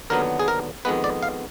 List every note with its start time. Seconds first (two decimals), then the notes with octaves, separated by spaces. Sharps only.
0.10 D#2 D3 F#3 B3 A#4
0.39 G#4
0.48 A#4
0.85 F2 D#3 G#3 B3 B4
1.04 D5
1.23 F5